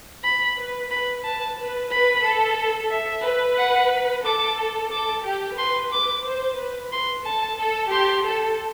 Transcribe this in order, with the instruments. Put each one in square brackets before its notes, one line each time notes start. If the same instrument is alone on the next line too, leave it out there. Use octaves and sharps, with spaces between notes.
[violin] B5
[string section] B4
[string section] B4 [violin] B5
[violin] A5
[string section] B4
[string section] B4 [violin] B5
[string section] A4
[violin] E5
[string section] B4
[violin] F#5
[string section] A4 [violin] D6
[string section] A4 [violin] D6
[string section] G4
[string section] B4 [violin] C6
[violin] D6
[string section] C5
B4
[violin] C6
[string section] A4 [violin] A5
[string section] A4
[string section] G4 [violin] C6
[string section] A4